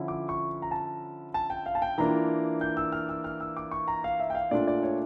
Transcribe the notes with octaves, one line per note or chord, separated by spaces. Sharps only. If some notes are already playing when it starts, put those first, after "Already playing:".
Already playing: D3 F3 C#4 E4
D6
C#6
A#5
A5
A5
G5
F5
A5
G5
E3 A#3 D4 F4 A#5
G6
E6
F6
E6
F6
E6
D6
C#6
A#5
F5
E5
G5
F5
A#2 A3 D4 F4 D5
D5
C#5